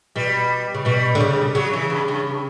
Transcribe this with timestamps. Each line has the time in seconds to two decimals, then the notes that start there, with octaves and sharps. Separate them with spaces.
0.16 B2 G3
0.75 C#3
0.85 B2 G3
1.15 D3
1.20 C#3
1.55 C#3 F#3
1.73 E3
1.90 G2
2.08 G2